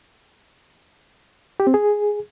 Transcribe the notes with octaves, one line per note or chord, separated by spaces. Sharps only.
G4
C4
G#4